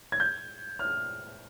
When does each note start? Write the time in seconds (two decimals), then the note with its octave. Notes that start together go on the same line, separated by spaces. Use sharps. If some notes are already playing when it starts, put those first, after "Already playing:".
0.12 G#6
0.20 G6
0.79 F6